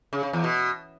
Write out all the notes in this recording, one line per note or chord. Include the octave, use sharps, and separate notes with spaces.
C#3
C#3
E2
B2